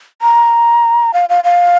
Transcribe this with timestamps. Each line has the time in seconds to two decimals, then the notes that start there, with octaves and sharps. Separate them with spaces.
0.22 A#5
1.14 F5
1.29 F5
1.44 F5